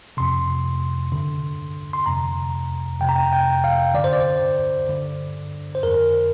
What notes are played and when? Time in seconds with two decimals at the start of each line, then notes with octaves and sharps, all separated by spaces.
0.17 F2 C3 C6
1.12 G2 D3
1.93 C6
2.06 F2 C3 A#5
3.00 F2 C3 G5
3.09 A#5
3.16 G5
3.33 G5
3.64 F5
3.94 D3 D5
3.99 G2 C5
4.13 D5
4.89 G2 D3
5.75 C5
5.83 F2 D3 A#4